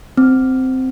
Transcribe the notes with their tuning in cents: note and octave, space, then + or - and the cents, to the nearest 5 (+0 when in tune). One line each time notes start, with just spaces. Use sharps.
C4 -10